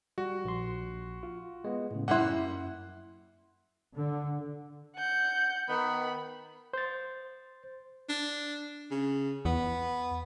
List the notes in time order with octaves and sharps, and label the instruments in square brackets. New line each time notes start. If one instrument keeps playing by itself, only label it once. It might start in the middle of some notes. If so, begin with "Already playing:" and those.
[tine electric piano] G3 [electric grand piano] F#4
[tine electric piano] A#1 C6
F4
G#3 B3
A2 C#3
[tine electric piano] F#2 F#6 [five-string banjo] G3 A#3 E4 [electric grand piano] F#5 C6
[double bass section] D3
[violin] F#5 G6
[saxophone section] D#3 B3 [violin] B5
[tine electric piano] C5 A6
[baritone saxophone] D4
C#3
[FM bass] E2 [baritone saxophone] B3